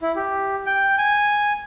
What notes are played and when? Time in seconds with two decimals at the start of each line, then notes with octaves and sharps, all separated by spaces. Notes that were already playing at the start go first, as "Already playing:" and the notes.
0.02 E4
0.16 G4
0.66 G5
0.98 G#5